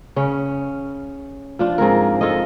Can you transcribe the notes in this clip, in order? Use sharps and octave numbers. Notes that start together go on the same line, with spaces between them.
C#3 C#4
F3 D4 F4
G#2 C4 G#4 A#4
F4 G#4 A4 D#5